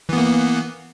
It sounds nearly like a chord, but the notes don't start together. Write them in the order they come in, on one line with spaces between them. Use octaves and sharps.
E3 B3 A#3